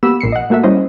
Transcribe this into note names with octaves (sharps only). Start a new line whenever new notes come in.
A#3 B3 G4 B5 E6 E7
A#1 A#2 C7 C#7
D#5 F#5
A3 A#3 F#4 A4 E5
G3 C#4 E4 C5 D#5